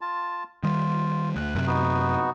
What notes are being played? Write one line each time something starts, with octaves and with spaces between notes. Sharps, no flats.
F4 A5
D#3 G3 F4
D2 F#6
F#2 C3
B3 D#4 F#4